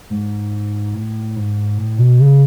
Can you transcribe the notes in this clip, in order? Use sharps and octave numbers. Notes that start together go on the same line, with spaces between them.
G#2
A2
G#2
A2
B2
C#3